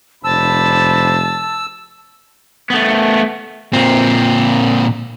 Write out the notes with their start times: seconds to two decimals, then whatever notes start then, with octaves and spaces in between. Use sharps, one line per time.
0.24 F1 D4 C5 A5 B5 E6
2.70 A3 B3
3.73 A#2 C4